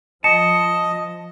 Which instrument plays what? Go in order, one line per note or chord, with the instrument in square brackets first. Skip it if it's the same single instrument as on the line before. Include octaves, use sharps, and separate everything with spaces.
[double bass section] F3 [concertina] D#5 [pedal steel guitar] A5 [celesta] C#7